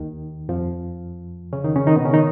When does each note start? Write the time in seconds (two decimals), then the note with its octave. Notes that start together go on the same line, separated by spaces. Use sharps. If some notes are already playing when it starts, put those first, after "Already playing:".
Already playing: D#2 D#3
0.49 F2 F3
1.53 C#3 C#4
1.64 D#3 D#4
1.76 C#3 C#4
1.87 D#3 D#4
1.96 B2 B3
2.05 C#3 C#4
2.13 D#3 D#4